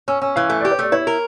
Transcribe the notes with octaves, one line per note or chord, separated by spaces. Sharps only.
C#4 E6
C#4 E6
E3 F5
A3 E5
G4 D5
C#5
A3 D5
E4 C#5
A#4